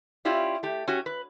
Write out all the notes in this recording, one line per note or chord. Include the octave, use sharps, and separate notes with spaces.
C#4 E4 F4 G4 D5
A3 G4
C#4 F#4 G4
B4